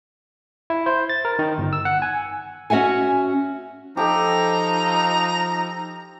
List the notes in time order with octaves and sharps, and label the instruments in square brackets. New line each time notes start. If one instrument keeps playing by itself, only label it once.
[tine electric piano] E4
C5
A6
A#4
D#3
G1
E6
F#5
G#5
[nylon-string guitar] C#4 F#4 E5 F#5 G#5
[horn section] F3 D#4 [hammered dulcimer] G4 A4 [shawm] A#5